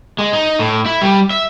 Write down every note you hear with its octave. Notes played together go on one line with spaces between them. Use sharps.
G#3
D#4
A2
E4
G3
E5